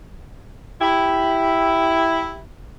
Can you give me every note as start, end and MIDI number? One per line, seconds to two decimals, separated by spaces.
0.81 2.41 64
0.81 2.44 67